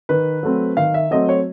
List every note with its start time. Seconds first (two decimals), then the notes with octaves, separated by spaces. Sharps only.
0.09 D#3 B4
0.43 F#3 A3 C4
0.77 D#3 F5
0.94 E5
1.11 F#3 A3 C4 D#5
1.29 C#5